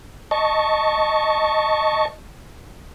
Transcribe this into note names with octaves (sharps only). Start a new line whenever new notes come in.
D#5 A5 C#6